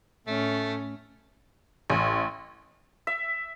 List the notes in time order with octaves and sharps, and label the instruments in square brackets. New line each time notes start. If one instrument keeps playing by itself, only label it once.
[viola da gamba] A2 C#4 [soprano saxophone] A3
[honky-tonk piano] A1
[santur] E5